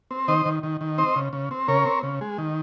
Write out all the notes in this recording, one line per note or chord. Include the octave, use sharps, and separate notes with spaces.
C4
D#3 C5 D#5
D#3
D#3
D#3
C4 C5 D#5
C#3
C#3
C4
C#3 A#4 C#5
C4
C#3
G#3
D#3